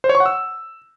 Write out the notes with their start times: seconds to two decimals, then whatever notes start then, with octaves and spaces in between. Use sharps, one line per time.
0.04 C5
0.09 C#5
0.15 C#6
0.20 F#5
0.26 E6